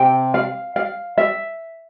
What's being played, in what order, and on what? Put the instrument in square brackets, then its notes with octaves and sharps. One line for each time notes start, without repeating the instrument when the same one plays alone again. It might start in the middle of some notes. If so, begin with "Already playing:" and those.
Already playing: [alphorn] C3 [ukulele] G5
[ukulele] F5
F5
E5